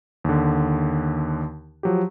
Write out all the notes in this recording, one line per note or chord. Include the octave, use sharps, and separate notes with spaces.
D#2 D3
F3 F#3 G4